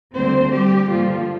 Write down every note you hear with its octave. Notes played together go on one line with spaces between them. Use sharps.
D2 D3 G3 A#3 C4 C5
G3 G4
G2 D3 F3 G3 A#3 F4